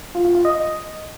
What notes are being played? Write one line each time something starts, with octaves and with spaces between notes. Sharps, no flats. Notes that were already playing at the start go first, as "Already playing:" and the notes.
F4
F4
F4
D#5